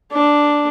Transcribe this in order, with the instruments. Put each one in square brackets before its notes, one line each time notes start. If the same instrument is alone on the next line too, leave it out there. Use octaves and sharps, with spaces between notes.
[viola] D4